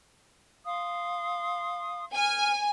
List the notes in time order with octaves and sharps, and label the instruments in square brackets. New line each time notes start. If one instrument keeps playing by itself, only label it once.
[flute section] F5 C6 D#6
[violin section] G#5 [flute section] F6